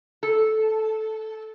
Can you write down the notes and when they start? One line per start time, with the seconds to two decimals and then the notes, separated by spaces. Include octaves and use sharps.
0.23 A4